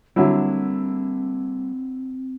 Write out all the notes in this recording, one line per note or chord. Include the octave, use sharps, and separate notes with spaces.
D3 F#3 G3 A#3 C4 E4